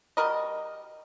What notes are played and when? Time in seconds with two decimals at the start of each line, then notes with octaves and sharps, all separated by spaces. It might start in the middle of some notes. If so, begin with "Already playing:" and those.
0.17 G3 F#4 A#4 D#5